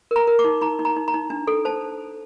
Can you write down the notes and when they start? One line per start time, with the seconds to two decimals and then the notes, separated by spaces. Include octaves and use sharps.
0.11 A#4 A#5
0.27 A#4
0.39 D6
0.45 D#4
0.61 D#4 A#5
0.79 D#4
0.85 A#5
0.97 D#4
1.08 A#5
1.14 D#4
1.30 D4
1.47 A4
1.65 C5 A5